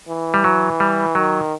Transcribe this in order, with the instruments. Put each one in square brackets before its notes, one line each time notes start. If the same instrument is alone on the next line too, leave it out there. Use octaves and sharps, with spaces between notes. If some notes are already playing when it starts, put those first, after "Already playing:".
[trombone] E3
[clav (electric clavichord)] G3
F#3
G3
[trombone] D#3 [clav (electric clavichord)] F#3